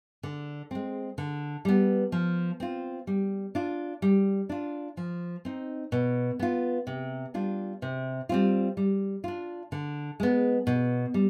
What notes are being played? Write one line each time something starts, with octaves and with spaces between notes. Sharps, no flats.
D3
G#3 C4
D3
G3 B3
F3
C4 F4
G3
D4 F4
G3
D4 F4
F3
C4 D#4
B2
B3 F4
C3
G3 D4 F4
C3
G3 C4 F4
G3
D4 F4
D3
G#3 B3
B2
G3